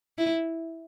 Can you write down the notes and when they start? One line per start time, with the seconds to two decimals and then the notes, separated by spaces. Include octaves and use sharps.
0.18 E4